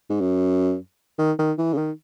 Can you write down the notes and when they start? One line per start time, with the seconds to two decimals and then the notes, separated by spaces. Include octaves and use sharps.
0.10 G#2
0.21 F#2
1.19 D#3
1.39 D#3
1.58 E3
1.73 C#3
1.77 D#3